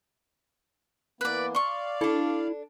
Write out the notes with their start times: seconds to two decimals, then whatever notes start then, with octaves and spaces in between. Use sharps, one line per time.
1.21 E3 A#3 B3 B4 D5
1.55 D5 F5 C6 C#6
2.01 D4 E4 A4